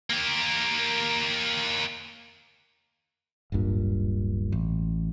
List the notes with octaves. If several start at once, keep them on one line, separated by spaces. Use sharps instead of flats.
A#3 G4
D1 G1 G2 A#2
A1